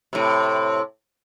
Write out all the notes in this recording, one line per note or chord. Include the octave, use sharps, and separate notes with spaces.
A2 C3